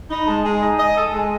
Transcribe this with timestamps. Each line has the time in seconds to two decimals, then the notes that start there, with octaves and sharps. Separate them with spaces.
0.10 D#4 B5
0.26 G#3 A5
0.43 G#3 G#5
0.60 D#4
0.78 D#5
0.95 A4
1.12 G#3